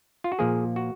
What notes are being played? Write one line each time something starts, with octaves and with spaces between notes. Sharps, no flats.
F4
F#4
A#2 F3 A#3 G#4
F#4